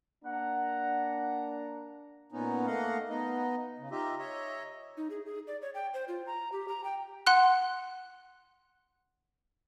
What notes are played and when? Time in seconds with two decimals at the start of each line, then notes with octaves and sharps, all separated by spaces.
0.25 A#3 D4 F#5 A#5
2.32 A#2 B3 C#4 D#4
2.67 A3 A#3 D#5 F5 F#5
3.09 B3 D#4 D#5
3.78 C#3
3.91 D#4 F4 G4 D#5 E5
4.19 C#5 D#5 E5
4.97 D#4
5.10 G#4
5.26 G#4
5.47 D5
5.62 C#5
5.74 G5
5.94 C5
6.08 F4
6.27 A#5
6.52 G4
6.68 A#5
6.84 G5
7.26 F#5 C6 F#6